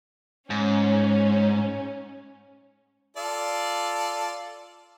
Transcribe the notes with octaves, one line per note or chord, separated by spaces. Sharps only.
G#2 C#4
F4 A4 D5